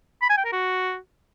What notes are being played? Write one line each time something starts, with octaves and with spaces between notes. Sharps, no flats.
B5
G#5
G5
A#4
F#4